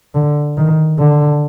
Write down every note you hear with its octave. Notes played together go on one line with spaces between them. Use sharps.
D3
D#3
D3